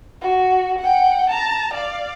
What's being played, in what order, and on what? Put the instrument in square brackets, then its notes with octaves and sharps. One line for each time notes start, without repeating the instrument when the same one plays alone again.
[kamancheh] F#4
F#5 G5
A5 A#5
D5 F5